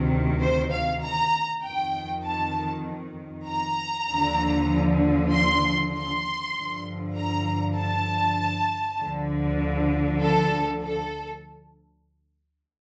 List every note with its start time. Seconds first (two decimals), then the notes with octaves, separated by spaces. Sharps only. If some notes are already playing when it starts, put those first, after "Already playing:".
Already playing: D2 C3 D#3
0.41 C5
0.72 F5
1.03 A#5
1.64 F2 D#3 G5
2.25 A5
3.48 A#5
4.09 D#2 D3 F3
5.32 C6
5.93 C6
6.55 G2 D3 F3
7.16 A#5
7.77 A5
9.00 D2 D3 F3
10.22 A4
10.83 A4